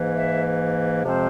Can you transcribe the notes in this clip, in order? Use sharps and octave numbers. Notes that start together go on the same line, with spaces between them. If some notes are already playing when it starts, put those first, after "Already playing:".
Already playing: G#2 E3 A#3
E5
F2 C3 F3 G#3 C4 C5